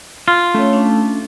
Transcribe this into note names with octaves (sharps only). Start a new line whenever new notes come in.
F4
A3 C#4 C#5
C#4 D4